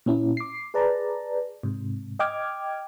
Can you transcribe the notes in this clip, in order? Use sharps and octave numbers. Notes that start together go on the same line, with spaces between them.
A#2 C#4 E4
D6 C7
G#4 B4 D5 A5 A#5
G#2 C3
D#5 G5 D6 F6 G#6